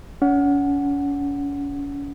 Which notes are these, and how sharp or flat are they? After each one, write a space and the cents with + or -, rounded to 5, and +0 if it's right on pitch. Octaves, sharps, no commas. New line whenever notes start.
C#4 +35 F#5 +0